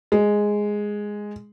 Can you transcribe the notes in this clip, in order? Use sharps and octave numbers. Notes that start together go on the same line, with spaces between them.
G#3